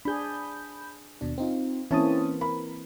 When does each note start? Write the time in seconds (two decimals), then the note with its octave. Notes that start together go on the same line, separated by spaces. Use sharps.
0.05 D4 G#4 B5 G6
1.21 D#2 B2 D4
1.38 C4 D#4 F4
1.91 E3 A#3 C4 C#4 E4 A5 D#6
2.41 A#4 B5